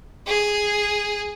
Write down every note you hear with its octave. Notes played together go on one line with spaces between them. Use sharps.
G#4